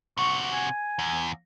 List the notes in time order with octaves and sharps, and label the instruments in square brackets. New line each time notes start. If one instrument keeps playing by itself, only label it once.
[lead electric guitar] C3 F#4 [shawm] C#6
[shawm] G#5
[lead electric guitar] E2